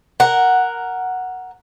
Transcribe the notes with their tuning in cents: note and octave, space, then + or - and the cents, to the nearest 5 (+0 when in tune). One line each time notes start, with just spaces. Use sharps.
A#4 +0 F#5 +0